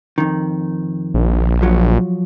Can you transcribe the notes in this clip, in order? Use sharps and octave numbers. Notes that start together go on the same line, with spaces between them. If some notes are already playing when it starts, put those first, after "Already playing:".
F2 D#3
A#1
F3 F#3